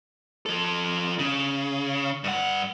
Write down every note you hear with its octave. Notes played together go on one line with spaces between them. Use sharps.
F3 A4
C#3
G2 F#5